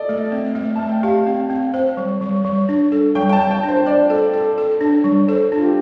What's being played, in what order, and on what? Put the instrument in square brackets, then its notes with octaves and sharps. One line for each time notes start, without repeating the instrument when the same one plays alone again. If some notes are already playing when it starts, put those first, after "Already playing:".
Already playing: [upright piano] A4 D5 D#5
[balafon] A3
C4
A3
[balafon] A3 [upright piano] A5
[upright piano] G5
[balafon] G4 [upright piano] F5
[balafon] C4
C4
C5
G3
G3
G3
D4
A4
[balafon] G3 [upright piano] G5
[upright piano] G5
A5
[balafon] G3
[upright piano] G5
[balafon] D4
[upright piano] C5
[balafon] C5 [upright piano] D5
[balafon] A4
A4
A4
D4
G3
[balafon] A4 [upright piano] C5
[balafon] D4
[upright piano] F4
G4